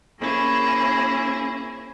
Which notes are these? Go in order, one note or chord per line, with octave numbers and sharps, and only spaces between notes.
A#3 C#4 E4 G#4 C5